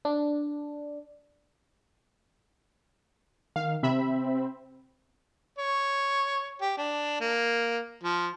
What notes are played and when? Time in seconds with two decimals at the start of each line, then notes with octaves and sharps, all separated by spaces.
0.05 D4
3.56 D#3 F5
3.83 C3 C4 E5 B5
5.58 C#5
6.61 G4
6.77 D4
7.21 A#3
8.03 F3